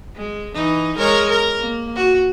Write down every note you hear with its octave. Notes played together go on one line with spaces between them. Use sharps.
G#3
E3 D#4
G#3 A#4 C#5
A#4
A#3
F#4